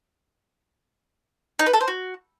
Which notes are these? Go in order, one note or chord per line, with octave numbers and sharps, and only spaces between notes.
D#4
B4
A4
C5
F#4